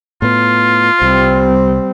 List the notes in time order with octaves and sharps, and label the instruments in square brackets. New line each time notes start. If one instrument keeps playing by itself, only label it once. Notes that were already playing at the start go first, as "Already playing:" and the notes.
[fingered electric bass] A2 B3 [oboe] F4
[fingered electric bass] C2 [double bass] G3 C4